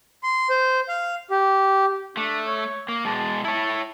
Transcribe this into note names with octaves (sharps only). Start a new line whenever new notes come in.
C6
C5
F5
G4
A3 D4
C#5
A#3
B2 G#3 A5
E4 C#5 A5